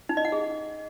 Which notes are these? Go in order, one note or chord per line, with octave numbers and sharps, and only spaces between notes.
D#4
D#5
F#5
G#4